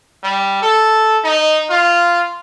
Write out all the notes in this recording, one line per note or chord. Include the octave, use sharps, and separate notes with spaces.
G3
A4
D#4
F4